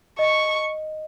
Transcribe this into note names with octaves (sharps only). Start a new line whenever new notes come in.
D#5 C#6